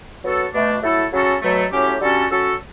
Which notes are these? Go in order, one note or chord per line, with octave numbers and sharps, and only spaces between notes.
F#3 B3 F#4 A4
B2 A3 D4
F#3 A3 E4 A4
C#3 F#3 C#4 F#4 A4
B2 F#3 A3
A2 F#3 C#4 G4
D3 G3 C#4 F#4 A4
F#3 C#4 F#4 A4